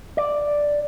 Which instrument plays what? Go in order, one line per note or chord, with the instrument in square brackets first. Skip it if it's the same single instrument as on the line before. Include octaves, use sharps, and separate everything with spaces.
[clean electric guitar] D5